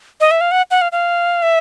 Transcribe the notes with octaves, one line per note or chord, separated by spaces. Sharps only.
D#5
E5
F5
F#5
F#5
F5
F5
E5